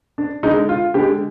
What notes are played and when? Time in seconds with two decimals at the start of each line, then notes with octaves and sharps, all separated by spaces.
0.18 D4
0.43 D3 G#3 D#4
0.69 F4
0.94 D3 G#3 G4